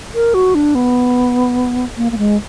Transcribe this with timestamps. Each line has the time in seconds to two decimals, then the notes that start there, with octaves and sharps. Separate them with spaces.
0.14 A#4
0.34 F#4
0.55 D4
0.75 B3
1.97 A#3
2.12 A#3
2.18 G#3